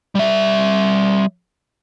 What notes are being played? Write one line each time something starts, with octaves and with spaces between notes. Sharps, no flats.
G3 E5